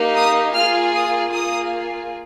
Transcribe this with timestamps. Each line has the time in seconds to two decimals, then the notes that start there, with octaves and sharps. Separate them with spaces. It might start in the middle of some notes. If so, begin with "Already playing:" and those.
Already playing: A#3 D#4 G4
0.16 D#6
0.54 A#3 F4 G#4 F6
0.94 D#6
1.32 A#3 F4 G#4 D#6